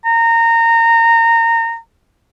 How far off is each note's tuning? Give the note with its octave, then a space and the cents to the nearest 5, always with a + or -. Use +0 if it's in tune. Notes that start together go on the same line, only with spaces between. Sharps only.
A#5 -20